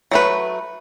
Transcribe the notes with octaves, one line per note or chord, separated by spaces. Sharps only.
F#3 A3 B4